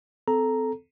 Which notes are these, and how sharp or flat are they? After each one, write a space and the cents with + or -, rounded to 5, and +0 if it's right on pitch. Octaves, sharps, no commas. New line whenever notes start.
C4 -30 A4 -10 A#5 +0